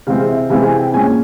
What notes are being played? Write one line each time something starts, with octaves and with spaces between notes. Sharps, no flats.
C3 E3 G#3 C4 F5
E5
C3 E3 G#3 C4 F5
G#5
G5
A#2 G#3 C#4 G#5